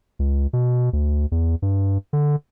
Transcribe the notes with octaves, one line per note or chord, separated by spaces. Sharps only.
C#2
B2
D2
E2
G2
D3